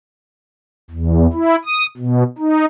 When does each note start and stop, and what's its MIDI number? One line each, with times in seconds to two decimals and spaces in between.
0.91 1.27 40
1.33 1.56 64
1.65 1.86 87
1.97 2.23 47
2.38 2.65 63